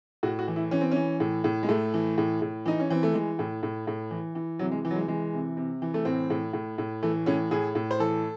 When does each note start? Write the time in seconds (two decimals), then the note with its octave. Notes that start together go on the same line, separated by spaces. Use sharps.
0.23 A2 F#4
0.39 F#4
0.48 E3
0.56 E4
0.71 E3 C#4
0.81 C4
0.91 E3 C#4
1.20 A2
1.44 A2
1.63 G#3
1.69 A2 A3
1.94 E3
2.18 A2
2.42 A2
2.66 E3 D#4
2.80 C#4
2.90 E3 C4
3.03 A3
3.14 E3 G#3
3.39 A2
3.63 A2
3.87 A2
4.11 E3
4.35 E3
4.59 C3 F#3
4.71 G#3
4.85 E3
4.91 F#3
4.96 G#3
5.08 E3 G#3
5.33 C3
5.57 C3
5.82 E3
5.94 A3
6.05 A2 C4
6.30 A2
6.53 A2
6.78 A2
7.03 E3 A3
7.26 A2 C#4
7.51 A2 G#4
7.75 A2
7.91 C5
7.99 E3 A4